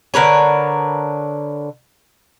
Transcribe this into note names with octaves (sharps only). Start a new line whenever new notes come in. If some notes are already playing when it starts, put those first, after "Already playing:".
D3 A#4 B4 C#5